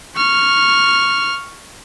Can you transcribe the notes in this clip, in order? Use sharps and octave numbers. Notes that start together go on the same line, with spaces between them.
C#6 F6